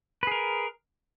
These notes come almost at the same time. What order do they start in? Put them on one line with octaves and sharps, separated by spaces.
B4 G#4 A#4